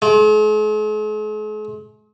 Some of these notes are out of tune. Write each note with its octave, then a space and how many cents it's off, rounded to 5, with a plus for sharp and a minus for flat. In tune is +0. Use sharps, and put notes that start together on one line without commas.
G#3 +45